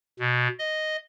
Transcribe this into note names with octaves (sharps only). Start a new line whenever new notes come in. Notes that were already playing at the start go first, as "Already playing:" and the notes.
B2
D#5